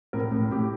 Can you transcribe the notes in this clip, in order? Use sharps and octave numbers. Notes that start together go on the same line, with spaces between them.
A2 A#4
A2
A2 G4